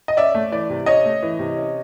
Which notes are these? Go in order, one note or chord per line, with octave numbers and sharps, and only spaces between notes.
D#5
C#4 D5 E5
A3
E3 D5
C3
C#4 C#5 D#5
A3
E3
C3
C#4